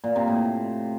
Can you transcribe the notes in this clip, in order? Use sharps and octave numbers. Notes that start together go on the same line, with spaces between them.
A#2
C3
A2